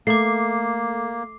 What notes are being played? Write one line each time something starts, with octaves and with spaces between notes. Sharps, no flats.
A3 A#3 D6 C7